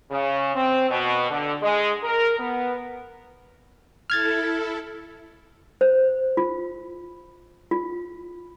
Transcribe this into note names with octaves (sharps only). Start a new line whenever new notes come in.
C#3
C4
B2
D3
G#3
A#4
B3
E4 A4 F6 G#6 A6
C5
F4
F4